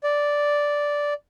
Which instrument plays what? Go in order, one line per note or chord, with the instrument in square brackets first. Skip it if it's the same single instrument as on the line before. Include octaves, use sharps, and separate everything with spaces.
[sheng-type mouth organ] D5